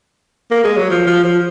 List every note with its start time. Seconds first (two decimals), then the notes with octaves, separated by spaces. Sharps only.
0.51 A#3
0.64 G#3
0.77 F#3
0.90 F3
1.06 F3
1.24 F3